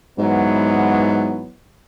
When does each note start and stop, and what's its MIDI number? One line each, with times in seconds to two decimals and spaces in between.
0.18 1.43 44
0.18 1.51 52
0.18 1.51 54
0.18 1.51 59